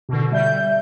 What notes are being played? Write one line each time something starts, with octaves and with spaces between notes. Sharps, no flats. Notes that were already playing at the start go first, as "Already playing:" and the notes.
B2 D3
G3 E5 G6